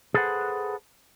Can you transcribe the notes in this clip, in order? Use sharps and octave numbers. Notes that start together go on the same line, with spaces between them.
G#4 A4 B4 C5 F#5